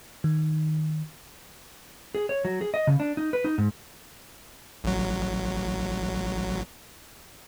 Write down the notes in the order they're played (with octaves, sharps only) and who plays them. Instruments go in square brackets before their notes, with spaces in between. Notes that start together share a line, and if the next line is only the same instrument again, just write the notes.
[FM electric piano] D#3
[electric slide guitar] G#4
C#5
F#3
G#4
D#5
C#3
D4
D#4
B4
D#4
G#2
[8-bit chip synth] A1 F#3